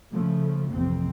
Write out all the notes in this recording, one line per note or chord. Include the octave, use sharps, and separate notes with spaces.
C#3 F3 A3
A1 F2 C3 C4